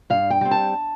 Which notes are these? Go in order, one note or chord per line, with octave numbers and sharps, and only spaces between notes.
G2 F5
G5
G3 C4
A5